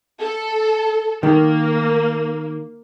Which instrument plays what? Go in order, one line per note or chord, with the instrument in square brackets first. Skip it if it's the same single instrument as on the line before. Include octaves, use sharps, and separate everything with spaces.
[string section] A4
[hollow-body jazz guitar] D#3 [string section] A#3